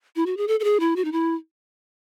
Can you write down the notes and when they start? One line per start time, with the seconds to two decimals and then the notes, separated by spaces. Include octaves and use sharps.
0.16 E4
0.26 F#4
0.37 G#4
0.48 A4
0.60 A4
0.64 G#4
0.80 E4
0.96 F#4
1.05 D#4
1.12 E4